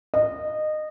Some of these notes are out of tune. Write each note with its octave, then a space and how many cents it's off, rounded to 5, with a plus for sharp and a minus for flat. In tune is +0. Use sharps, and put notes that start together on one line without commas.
D#5 -20